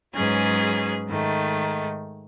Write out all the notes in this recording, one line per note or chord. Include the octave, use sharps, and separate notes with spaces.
G#2 F#3 C#4 G#4 B4
G#2 D#3 A3